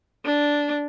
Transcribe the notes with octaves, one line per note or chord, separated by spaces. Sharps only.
D4